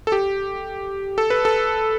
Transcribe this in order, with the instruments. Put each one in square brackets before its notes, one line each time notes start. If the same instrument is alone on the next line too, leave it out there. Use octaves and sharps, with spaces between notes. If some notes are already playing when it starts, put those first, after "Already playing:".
[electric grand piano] A4
G4
A4
B4
A4